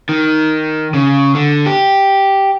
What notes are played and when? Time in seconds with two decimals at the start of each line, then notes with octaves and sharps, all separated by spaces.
0.09 D#3
0.94 C#3
1.35 D3
1.66 G4